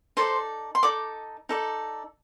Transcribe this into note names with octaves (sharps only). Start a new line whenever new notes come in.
D#4 A4 C5 D5 C6
C6
D#4 A4 D5 D6
D#4 A4 D5